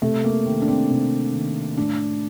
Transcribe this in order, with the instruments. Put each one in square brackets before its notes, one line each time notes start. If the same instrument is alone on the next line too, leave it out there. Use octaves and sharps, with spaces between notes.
[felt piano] C3 A3
A#3
D#3 C4
D4
C4
C3
D#3
A2 D4